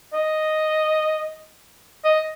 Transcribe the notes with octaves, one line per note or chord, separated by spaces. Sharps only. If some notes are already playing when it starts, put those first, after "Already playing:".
D#5
D#5